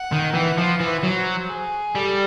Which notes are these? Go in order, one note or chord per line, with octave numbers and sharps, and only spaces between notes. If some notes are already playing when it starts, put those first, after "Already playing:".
Already playing: F#5
D#3
E3
F3
E3
F#3 C5
G#4
G3 A4